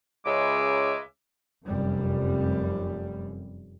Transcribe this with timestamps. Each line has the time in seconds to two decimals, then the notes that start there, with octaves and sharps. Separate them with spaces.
0.24 C#2 C#3 G#3 E5 D6
1.68 F1 F#2 G3